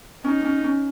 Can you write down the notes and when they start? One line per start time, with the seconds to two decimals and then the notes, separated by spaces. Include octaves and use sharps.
0.24 C#4 D#4
0.44 C#4
0.64 C#4